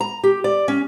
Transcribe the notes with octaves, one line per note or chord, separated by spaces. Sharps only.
A#5
G4
D5
C#4